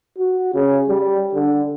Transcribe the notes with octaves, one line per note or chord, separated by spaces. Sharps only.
F#4
C#3
G3
D3